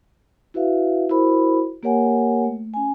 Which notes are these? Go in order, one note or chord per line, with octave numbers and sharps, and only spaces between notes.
E4 F#4 B4 E5 F5
E4 F#4 A#4 C5 B5
A#3 G4 A#4 C#5 F#5 G#5
A3
C#4 G#5